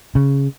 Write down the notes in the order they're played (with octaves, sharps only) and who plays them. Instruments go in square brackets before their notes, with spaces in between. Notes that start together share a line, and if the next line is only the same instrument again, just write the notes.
[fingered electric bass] C#3